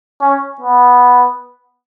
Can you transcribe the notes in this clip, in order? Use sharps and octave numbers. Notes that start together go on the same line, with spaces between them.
C#4
B3